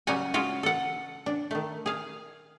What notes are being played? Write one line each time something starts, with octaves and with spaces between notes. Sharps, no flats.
C#3 F#3 G3 A#4 F#5 G#5
G#3 F4 F#4
A4 F#5
D4
D#3 A3
G#4 F5